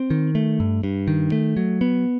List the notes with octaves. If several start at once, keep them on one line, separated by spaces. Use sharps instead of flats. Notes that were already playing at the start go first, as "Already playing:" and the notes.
Already playing: C4
D#3
A3
G2
G2
D#3
A3
F#3
B3